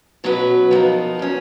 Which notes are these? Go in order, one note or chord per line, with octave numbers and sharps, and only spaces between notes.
B2 F#3 C#4 F#4 B4
F3 B3 D#4 A#4
F#3 C#4 F#4